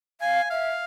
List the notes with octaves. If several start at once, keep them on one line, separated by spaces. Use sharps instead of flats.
F5 G#5
E5 F5